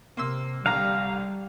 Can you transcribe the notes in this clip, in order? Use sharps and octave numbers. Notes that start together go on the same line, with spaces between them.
C3 A#3 C6 E6
C2 D3 G3 F5 A#5